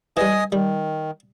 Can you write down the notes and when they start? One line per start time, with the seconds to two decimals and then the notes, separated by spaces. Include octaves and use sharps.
0.17 E3 G3 D#5 G#5 D#6
0.52 D#3 G3